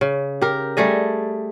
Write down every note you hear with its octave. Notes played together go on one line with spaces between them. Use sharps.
C#3
G4 A#4
G3 A3 G#4 D#5